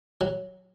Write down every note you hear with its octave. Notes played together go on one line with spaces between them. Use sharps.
F#3